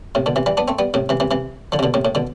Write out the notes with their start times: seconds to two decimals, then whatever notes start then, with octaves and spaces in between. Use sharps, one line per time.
0.15 A2 C3
0.26 B2 D3
0.36 C3 E3
0.46 E3 G3
0.57 B3 D4
0.68 A3 C4
0.79 G3 B3
0.94 A2 C3
1.09 C3 E3
1.20 C3 E3
1.31 C3 E3
1.72 D3 F3
1.79 C3
1.83 B2 D3
1.94 A2 C3
2.05 A2
2.15 B2 D3